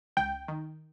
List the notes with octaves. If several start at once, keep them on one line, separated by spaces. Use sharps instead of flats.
C#2 G5
D#3